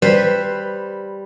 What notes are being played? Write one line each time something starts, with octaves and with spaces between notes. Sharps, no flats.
G3 B4 C5